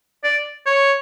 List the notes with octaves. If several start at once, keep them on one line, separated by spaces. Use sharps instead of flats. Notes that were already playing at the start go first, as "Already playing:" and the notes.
D5
C#5